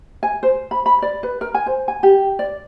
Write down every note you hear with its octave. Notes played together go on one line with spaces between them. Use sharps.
G#5
C5
B5
B5
D5
B4
A#4
G#5
C5
G#5
G4
D5